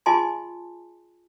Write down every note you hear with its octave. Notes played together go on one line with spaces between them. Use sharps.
F4 G#4 D#5 G#5 A5 C6